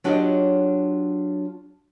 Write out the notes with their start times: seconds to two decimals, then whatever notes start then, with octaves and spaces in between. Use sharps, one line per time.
0.04 F#3 D4 F4 G4 C#5 D#5